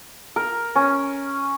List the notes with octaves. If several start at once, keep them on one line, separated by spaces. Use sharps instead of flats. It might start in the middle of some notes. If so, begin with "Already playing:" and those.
A#4
C#4